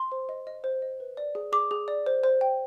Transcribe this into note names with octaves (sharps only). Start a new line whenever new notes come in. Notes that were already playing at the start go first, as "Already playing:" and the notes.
Already playing: C6
C5
D#5
D#5
C5
D#5
B4
D5
G#4
G#4 D6
G#4
D5
C5
C5
G5